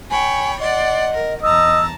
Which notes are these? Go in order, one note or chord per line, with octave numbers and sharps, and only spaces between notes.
C#5 G5 G#5 B5
D5 D#5 F#5 C6
A#4
E2 D#5 A5 A#5 E6